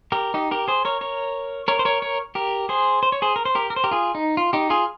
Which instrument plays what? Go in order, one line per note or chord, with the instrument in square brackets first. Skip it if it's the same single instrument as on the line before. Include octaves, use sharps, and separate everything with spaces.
[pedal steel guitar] G4 A#4
D#4 G4
G4 A#4
G#4 C5
A#4 C#5
A#4 C#5
A#4 C#5
C5
A#4 C#5
A#4 C#5
G4 A#4
G#4 C5
C5
C#5
G#4 C5
A#4
C5
G4 A#4
A#4
C5
G4 A#4
F4 G#4
D#4
F4
D#4 G4
F4 G#4